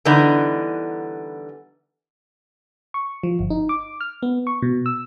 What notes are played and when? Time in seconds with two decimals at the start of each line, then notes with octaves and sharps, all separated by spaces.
0.05 D3 E3 G3 B3 D4 D#4
2.94 C#6
3.23 F3
3.39 G1
3.50 D#4
3.69 D6
4.01 F6
4.23 B3
4.47 C#6
4.62 B2
4.86 E6